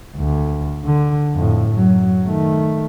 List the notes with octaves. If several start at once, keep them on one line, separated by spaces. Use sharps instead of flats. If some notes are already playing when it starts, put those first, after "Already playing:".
D2
D3
F2 A2
F#2 F#3
D#3 A3